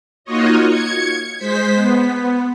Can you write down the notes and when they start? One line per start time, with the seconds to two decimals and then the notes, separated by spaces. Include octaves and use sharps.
0.24 A#3 D#4 F4 F#4 C#5 D#5
0.66 G#6 C#7
1.38 G#3 C5 B6
1.74 B3